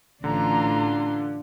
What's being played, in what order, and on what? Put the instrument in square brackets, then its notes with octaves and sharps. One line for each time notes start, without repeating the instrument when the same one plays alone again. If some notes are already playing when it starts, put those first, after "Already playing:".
[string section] A1 [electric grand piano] D3 [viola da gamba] D4 F4 [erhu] A#5